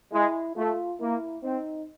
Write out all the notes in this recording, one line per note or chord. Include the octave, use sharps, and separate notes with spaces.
G#3 E4
A3 F4
A#3 E4
C4 D#4